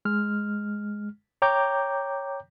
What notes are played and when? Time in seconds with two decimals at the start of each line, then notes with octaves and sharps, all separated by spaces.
0.05 G#3 F6
1.42 C#5 G5 A#5 D6 G6